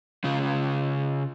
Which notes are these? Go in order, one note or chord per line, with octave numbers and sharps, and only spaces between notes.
C#3 F4